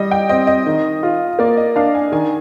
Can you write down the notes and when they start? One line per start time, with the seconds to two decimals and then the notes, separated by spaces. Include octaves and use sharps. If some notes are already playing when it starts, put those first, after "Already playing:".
Already playing: G3 D#5
0.11 G5
0.29 C4 D#5
0.47 D#5
0.66 D#3
1.03 F4
1.39 A#3 D5
1.57 D#5
1.76 D4 F5
1.95 G#5
2.12 D#3 G#5